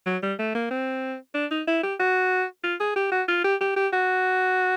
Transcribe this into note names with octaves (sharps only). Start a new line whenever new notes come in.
F#3
G3
A3
A#3
C4
D4
D#4
E4
G4
F#4
F4
G#4
G4
F#4
F4
G4
G4
G4
F#4